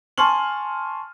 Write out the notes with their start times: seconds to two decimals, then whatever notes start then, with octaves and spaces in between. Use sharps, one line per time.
0.18 G#5 A5 C6 C#6 F6 F#7